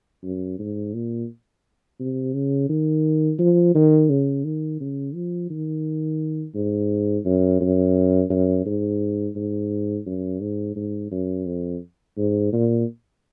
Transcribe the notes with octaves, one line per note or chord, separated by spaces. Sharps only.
F#2
G#2
A#2
C3
C#3
D#3
F3
D#3
C#3
D#3
C#3
F3
D#3
G#2
F#2
F#2
F#2
G#2
G#2
F#2
G#2
G#2
F#2
F2
G#2
A#2